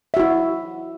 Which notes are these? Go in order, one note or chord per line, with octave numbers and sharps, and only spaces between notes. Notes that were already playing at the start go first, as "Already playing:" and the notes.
E4 F#4 E5